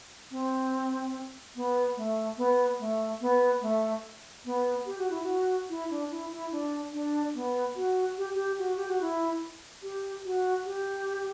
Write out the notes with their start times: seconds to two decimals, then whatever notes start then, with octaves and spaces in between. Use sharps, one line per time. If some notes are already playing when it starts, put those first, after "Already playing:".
0.31 C4
1.56 B3
1.97 A3
2.37 B3
2.80 A3
3.21 B3
3.62 A3
4.45 B3
4.86 G4
4.98 F#4
5.10 E4
5.23 F#4
5.70 E4
5.90 D4
6.11 E4
6.32 E4
6.52 D4
6.93 D4
7.34 B3
7.76 F#4
8.18 G4
8.35 G4
8.59 F#4
8.77 G4
8.88 F#4
9.01 E4
9.83 G4
10.25 F#4
10.66 G4